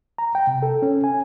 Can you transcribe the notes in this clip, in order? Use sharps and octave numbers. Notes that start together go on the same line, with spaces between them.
A#5
G5
C3
A4
C#4
G#5